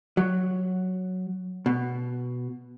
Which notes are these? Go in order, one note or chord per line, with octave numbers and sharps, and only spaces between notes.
F#3
B2